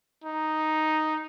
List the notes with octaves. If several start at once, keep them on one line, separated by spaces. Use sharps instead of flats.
D#4